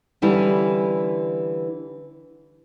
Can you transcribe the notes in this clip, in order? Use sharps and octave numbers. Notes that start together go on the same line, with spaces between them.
D3 E3 G3 C#4 E4